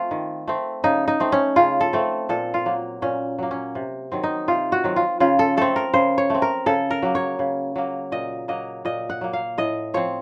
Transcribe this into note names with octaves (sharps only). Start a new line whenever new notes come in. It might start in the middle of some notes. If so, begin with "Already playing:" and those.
Already playing: A3 C4 F4
D#3
A3 C4
C#3 D#4
D#4
A3 C4
C#4
C#3 F4
A4
A3 C4
A#2 A4
F4
F#3 A#3
A#2 C#4
F#3 A#3
C#4
C3
D#3 F#3 C4
D#4
C3 F4
F#4
D#3 F#3 C4
F4
C#3 F4
A4
A3 C4 A4
A#4
C#3 C5
C#5
A3 C4
A#4
C#3 A4
A#4
F#3 A#3
C#5
C#3
F#3 A#3
A#2 D#5
F#3 A#3 D#5
A#2 D#5
F#5
F#3 A#3
F5
A2 D#5
F3 C4 C#5